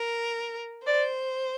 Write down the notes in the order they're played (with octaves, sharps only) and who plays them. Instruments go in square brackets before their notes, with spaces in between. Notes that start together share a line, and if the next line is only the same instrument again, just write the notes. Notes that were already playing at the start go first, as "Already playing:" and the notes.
Already playing: [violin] A#4
[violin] C5 [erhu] D5